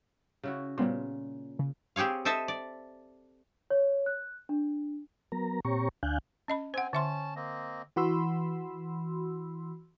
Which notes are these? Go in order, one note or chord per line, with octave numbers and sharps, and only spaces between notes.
C#3 E4 F#4
A#2 C#3 G3 B3 C5
C#3
C4 G4 G#4 C#5 F5
A4 C5 D#5 E5 A5
D5
C#5
F#6
D4
F#3 B3 A#4 A#5
A#2 C4 G4 C#5 A#5 C#6
D2 D4 F5 G#5 F#6 G6
C#4 D#5 B5
C4 C5 F#5 G#5
D3 C#4 E5 A5 C6
A#3 C4 D#5
E3 F#4 B5 C6 E6